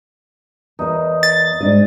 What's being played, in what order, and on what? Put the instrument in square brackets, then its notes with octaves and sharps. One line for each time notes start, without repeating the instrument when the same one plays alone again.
[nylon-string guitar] E2 A#4 [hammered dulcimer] D#4
[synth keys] A6
[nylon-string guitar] G#2 D4 D#5